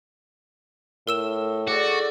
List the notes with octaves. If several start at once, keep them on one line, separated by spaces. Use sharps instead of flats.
A2 A#4 E6 E7
F#4 G#4 A4 D5